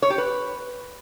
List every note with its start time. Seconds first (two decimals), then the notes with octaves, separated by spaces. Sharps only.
0.02 C#5
0.10 G4
0.18 B4